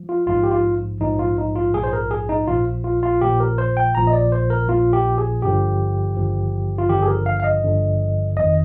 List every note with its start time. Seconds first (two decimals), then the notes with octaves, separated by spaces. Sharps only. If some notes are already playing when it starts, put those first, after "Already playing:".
Already playing: F3
0.09 F4
0.26 A#1 G#2 F3 F4
0.43 G4
0.51 F4
1.01 A#1 G#2 F3 D#4
1.19 F4
1.38 D#4
1.56 F4
1.74 A#1 G#2 F3 G#4
1.84 C5
1.93 A#4
2.11 G#4
2.29 D#4
2.47 A#1 A#2 F3 F4
2.84 F4
3.03 F4
3.21 A#1 A#2 F3 G4
3.40 A#4
3.58 C5
3.77 G5
3.95 A#1 A#2 F3 A#5
4.07 D#5
4.13 D5
4.32 C5
4.50 A#4
4.69 A#1 A#2 F3 F4
4.93 G4
5.18 G#4
5.42 G#1 G2 D3 F3 G4
6.16 G#1 G2 D3 F3
6.78 F4
6.89 G#1 G2 D3 F3 G4
7.03 G#4
7.08 A#4
7.26 F5
7.40 F5
7.44 D#5
7.63 G#1 G2 D3 F3
8.37 G1 F2 D#3 D#5